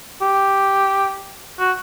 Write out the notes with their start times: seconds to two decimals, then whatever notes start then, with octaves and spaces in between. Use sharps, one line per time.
0.21 G4
1.59 F#4